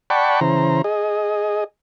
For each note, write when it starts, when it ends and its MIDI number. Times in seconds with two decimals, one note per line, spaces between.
0.10 0.40 74
0.10 0.40 78
0.10 0.40 79
0.10 0.40 81
0.10 0.40 83
0.10 0.40 85
0.41 0.82 49
0.41 0.82 52
0.41 0.82 72
0.41 0.82 82
0.84 1.64 68
0.84 1.64 75